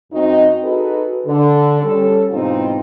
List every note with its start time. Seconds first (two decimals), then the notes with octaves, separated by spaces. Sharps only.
0.12 F#2 C4 D#4 F#4 D#5
0.64 D#4 F#4 G#4 A4 B4
1.26 D3
1.81 G3 C#4 A4
2.31 G#2 B2 E3 C4 D#4 F4